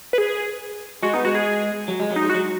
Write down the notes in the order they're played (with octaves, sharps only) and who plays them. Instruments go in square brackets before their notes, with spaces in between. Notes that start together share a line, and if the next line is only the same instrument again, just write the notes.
[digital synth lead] B4
G#4
[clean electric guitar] G#3 [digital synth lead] F#4
[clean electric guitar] B3 [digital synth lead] D#4
[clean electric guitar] G#3 [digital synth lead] F#4
[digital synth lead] G#4
[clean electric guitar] F#3
G#3
F#3
[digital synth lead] D#4
[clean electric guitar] G#3
[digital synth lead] F#4
[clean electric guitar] F#3